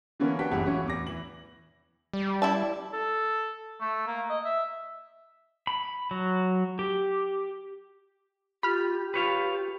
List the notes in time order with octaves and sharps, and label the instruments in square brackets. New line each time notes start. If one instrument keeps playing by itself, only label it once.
[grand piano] D3 E3 A#3 B3 C#4
D4 F#4 B4 G5 B6
G1 F#2 E3 G#3 G4 F#5
A2 E3 C#4 F#4
E2 D6 A#6
E3 F#7
[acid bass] G3
[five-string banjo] E4 E5 A5
[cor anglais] A4
A3
A#3
D#5
E5
[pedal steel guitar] B5
F#3
G4
[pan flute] F4 [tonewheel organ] G4 [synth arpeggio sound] B5 F6
[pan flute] F4 [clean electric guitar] B4 C#5 F5